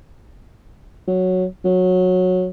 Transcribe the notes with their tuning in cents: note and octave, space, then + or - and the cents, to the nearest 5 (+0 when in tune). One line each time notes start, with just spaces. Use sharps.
F#3 -5
F#3 -15